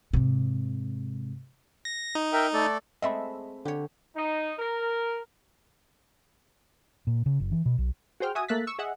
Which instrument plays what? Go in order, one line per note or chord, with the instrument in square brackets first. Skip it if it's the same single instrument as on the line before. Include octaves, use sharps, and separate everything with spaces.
[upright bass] G#2 C3
[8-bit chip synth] A#6
D#4
[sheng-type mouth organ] A#4 E5 G5
A3 A4 D5
[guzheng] G#3 A3 C4 [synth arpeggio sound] D#5 E5 B5
[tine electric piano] D3 [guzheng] G4 C#5
[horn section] D#4
A#4
[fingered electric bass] A#2
C#3
F#1
E3
B2
B1
[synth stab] F#4 G#4 C5 G5 F6
F#4 E5 G#5 D#6
A3 A#3 E5 F#6 A6 B6
C#6 E6
G#4 D#5 E5 F#5